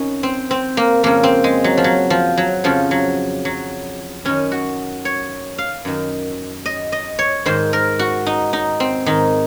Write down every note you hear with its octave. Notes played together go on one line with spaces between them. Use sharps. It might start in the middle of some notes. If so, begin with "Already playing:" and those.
Already playing: F2 D#3 C#4 D#4
C4
C4
A#3
F2 C#3 A#3
C4
G#3
F#3
F3
F#3
F3
F#3
F2 C#3 F3
F#3
F#3
F#2 D#3 C#4
F#4
C#5
F5
F#2 D#3
D#5
D#5
C#5
G#2 D#3 C5
A#4
F#4
D#4
D#4
C4
G#2 D#3 D#4